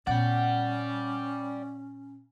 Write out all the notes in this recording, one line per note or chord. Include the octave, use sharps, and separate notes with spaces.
A#2 B3 C#4 D5 F#5 G5